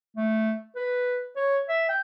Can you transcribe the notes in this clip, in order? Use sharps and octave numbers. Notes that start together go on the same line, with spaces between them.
A3
B4
C#5
E5
G5